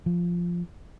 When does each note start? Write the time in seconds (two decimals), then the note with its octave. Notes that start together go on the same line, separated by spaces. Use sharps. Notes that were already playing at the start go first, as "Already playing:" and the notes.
0.06 F3